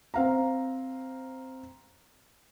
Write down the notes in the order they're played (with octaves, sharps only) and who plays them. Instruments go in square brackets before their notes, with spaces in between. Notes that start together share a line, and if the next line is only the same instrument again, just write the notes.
[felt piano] C4 F5 A#5